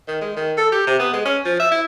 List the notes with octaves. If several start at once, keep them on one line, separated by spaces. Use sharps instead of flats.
D#3
G#3
D#3
A4
G4
C3
B3
G#3
C#4
F3
E5
E4